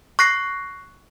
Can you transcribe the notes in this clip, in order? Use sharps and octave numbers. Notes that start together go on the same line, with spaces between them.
C#6 F#6 A#6 C7